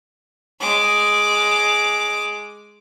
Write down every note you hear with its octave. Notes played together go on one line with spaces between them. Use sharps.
G#3 D6